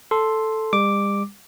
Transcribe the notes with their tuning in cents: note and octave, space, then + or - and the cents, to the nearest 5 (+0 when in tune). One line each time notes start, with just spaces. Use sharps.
A4 +0 C6 +0
G3 +40 D6 +0